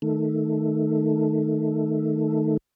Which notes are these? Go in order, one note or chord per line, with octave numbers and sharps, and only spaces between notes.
D#3 A3